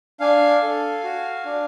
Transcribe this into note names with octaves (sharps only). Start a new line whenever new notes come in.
D4 F5 G#5
A4
F#4
D4